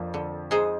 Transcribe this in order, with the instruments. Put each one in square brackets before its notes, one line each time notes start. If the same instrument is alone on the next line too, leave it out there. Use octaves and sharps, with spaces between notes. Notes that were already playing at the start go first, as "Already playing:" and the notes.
Already playing: [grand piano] F2 F3 [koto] A#3 D4
[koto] D3
G#3 D#4 G#4 C5